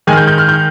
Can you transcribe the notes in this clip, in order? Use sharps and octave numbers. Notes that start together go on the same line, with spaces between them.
D#3 G#3 D#4 G#5
F6
G6
G6
F6
G6